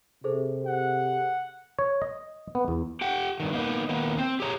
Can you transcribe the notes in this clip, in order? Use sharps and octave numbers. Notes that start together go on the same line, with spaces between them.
C3 G#4 A4 C5
F#5
C#5
D#5
B3
E2
G4 F#5 G5
G2 D#3
A#3 B3 D#4
D#3 A#3 B3
C4
G4 G#4 C#5 A#5